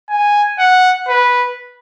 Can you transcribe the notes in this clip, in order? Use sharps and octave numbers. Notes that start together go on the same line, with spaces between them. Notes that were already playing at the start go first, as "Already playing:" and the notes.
G#5
F#5
B4